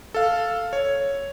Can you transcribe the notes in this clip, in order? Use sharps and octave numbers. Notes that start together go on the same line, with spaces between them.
A4 F5
C#5